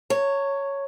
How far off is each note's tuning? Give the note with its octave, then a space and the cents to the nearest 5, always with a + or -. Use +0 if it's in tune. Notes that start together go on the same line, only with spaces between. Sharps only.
C#5 +0 A#5 -40